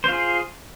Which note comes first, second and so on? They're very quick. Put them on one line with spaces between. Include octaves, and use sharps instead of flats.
C5 F4 G#4